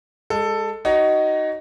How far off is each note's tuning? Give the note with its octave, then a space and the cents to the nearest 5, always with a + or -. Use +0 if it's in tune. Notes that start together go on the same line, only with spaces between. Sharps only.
G#3 -20 A4 +10
D#4 +0 F#4 +30 C#5 +20